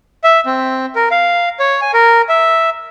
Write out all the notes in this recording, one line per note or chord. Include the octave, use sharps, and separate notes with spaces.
E5
C4
A#4
F5
C#5
G#5
A#4
E5